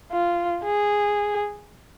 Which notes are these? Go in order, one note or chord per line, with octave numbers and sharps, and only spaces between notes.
F4
G#4